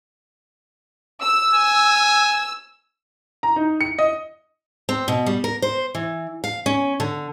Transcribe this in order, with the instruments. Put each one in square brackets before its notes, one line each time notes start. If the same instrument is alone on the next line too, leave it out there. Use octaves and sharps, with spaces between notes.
[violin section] E6
[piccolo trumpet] G#5
[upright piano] A#5
D#4
C#7
D#5
[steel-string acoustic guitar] C4
B2
G3
A#4
C5
E3
F5
C#4
D3